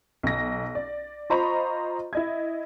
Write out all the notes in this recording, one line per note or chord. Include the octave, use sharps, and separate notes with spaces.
B1 A#6
D5
F4 C5 D#5 A#5 B5 C#6
E4 D#5 G#6